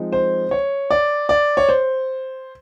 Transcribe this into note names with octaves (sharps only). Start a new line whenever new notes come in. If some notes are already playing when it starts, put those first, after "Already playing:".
Already playing: F3 G#3 C4 D#4
C5
C#5
D5
D5
C#5
C5